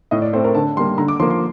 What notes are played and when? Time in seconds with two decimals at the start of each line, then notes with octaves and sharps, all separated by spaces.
0.11 A2 D#5
0.22 D5
0.33 A3 C4 C5
0.44 A#4
0.55 D3 A5
0.77 G3 A#3 C6
0.98 D3 A#5
1.08 D6
1.20 F3 A#3 C6
1.30 C6